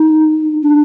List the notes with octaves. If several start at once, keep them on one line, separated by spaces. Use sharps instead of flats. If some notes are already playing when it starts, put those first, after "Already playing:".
Already playing: D#4
D4